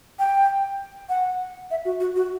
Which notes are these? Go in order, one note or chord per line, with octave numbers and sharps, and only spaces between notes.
G5
F#5
E5
F#4
F#4
F#4